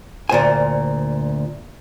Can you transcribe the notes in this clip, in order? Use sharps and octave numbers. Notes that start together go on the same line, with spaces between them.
D2 A#2 C5 G#5